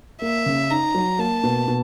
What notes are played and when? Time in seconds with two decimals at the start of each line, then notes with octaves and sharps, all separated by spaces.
0.22 A#3 E5
0.46 C#3
0.70 D#4 A#5
0.95 F#3
1.19 A#3 A5
1.43 B2
1.68 B2